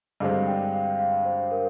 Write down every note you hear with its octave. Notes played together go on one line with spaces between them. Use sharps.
G2 D3 G#3 C4 F5
G5
F5
F5
C5
A#4